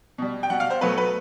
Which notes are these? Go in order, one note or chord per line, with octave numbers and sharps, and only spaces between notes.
B2 G3
G5
B2 G3 F#5
F5
C5
B2 F#3 A3 B4
B4